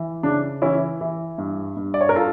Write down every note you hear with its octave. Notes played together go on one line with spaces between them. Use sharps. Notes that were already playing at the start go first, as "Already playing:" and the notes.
Already playing: E3
C#3 D4
E3 C#4 E4
E3
G2
G2
D5
C#5
A#4
F4 A4